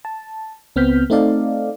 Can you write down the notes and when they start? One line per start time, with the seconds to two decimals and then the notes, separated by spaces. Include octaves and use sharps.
0.05 A5
0.76 C#2 B3 C4 F6 G6 B6
1.10 A3 C4 D#4 A4 D5 F5